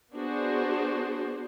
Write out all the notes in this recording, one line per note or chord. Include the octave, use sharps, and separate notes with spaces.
B3 D4 F#4 G#4 C5